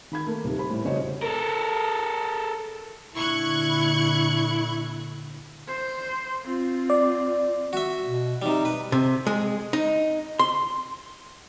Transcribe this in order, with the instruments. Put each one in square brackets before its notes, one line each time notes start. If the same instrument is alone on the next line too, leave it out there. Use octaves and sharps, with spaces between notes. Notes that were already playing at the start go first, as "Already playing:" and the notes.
[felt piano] D#3 B5 G#6
A3 A#3
D#1 C3 D#3
G4 C5 B5
A2 G3
F1 C#3 F#4 C5 C#5 D#5
[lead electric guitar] A4 A#4
[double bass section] A#2 D3 [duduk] E4 [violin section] C#6 F#6 G#6
[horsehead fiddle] C5
C4 F4
[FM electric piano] D5
[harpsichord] F#4 E5
[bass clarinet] B2
[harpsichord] C3 G3 [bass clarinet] D#4
[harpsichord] B4
[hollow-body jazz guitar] C3
G#3
D#4
C6